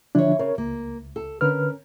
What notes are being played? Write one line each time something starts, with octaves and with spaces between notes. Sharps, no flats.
D3 F3 D4 E4 C#5
C#3 A#4 C#5
C#2 A#3
A4
D3 C#4 A#4 B4 F6